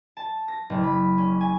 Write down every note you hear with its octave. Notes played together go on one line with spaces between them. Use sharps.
A5
A#6
F#1
B5
C#4
G#5